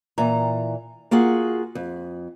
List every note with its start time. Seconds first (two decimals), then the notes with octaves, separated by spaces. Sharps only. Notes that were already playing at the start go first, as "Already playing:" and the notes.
0.18 A#2 E3 A#5
1.11 A#3 F4 F#4 G#4 F#5
1.75 F2